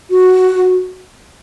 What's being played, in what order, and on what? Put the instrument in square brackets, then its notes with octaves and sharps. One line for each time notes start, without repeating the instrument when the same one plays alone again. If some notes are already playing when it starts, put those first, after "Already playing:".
[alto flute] F#4